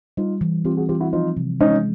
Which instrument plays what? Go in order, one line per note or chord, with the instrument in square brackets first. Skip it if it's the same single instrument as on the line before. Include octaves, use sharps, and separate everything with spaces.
[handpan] G3 [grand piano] D#4 F4
[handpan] E3
[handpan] C4 [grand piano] F4 G4
[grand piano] F#4 G#4
[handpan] E3 [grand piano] F4 G4
[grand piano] E4 F#4
[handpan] F3 [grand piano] D#4 F4
[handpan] C3
[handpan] G#3 [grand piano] C#4 D#4